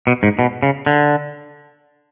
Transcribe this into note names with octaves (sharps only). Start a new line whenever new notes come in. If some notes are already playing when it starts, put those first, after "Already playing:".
B2
G#2
B2
C#3
D3